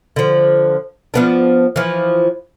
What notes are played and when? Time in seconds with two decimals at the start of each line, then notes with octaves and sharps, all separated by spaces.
0.16 D3 F3
1.14 F3 B3 D4
1.76 E3 F3